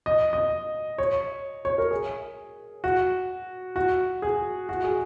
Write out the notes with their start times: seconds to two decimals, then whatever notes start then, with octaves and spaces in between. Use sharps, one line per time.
0.06 D#5
0.33 D#5
0.98 C#5
1.65 C#5
1.78 A#4
1.91 G#4
2.84 F#4
3.76 F#4
4.22 G#4
4.69 F#4
4.84 G#4